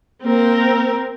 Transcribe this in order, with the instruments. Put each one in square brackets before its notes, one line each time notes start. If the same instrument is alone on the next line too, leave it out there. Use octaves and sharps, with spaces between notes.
[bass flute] A#3 [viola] C4 A#4